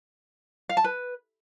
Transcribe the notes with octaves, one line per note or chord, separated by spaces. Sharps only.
F5
A5
B4